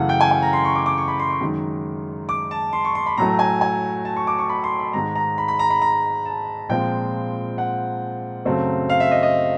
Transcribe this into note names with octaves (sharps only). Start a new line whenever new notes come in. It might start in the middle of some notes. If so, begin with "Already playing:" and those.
Already playing: F#2 C#3 E3 A3 F#5
G5
G#5
G#5
A#5
C6
C#6
D6
D6
C#6
B5
C6
C#6
F#2 D#3 G#3
D6
A5
C6
C#6
C6
B5
A2 F#3 A3 A#5
G#5
G#5
A5
C#6
D6
C#6
B5
C6
B5
G#2 D#3 G#3 A#5
A#5
B5
B5
A#5
B5
A#5
A5
A#2 F3 G#3 C4 G5
F#5
F#2 C#3 F#3 A3 C4
F5
E5
D#5
D#5